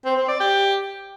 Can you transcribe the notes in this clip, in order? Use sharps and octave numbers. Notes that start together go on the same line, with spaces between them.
C4
C4
D5
G4